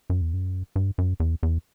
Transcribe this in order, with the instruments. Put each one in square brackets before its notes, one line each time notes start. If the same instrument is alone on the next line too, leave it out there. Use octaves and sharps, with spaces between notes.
[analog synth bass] F#2
E2
F#2
G2
F#2
E2
E2